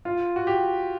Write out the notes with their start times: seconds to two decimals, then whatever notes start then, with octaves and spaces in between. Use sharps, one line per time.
0.05 F4
0.36 F#4
0.47 G4